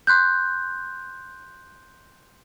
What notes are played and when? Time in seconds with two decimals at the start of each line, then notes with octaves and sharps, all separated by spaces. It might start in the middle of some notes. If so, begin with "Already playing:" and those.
0.07 C6 F#6 G6